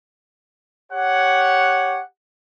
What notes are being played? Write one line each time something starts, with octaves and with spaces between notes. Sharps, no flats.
G4 C#5 F#5